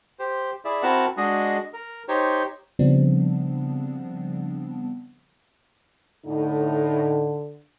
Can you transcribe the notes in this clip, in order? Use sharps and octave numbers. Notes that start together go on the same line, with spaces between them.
G4 C5
E4 G#4 D5 E5
C4 E4 F#4 A#4 F#5 A5
G#3 D4 F#4 G#4 D#5
A#4
D#4 G4 C5 C#5
C#3 F3 G3 B3 C4 D4
A2 D3 D#4